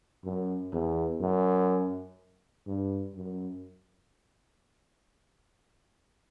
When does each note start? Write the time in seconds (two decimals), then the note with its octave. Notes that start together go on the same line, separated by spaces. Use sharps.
0.25 F#2
0.73 E2
1.21 F#2
2.67 G2
3.15 F#2